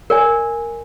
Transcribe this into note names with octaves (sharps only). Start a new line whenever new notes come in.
A#4 D5 G#5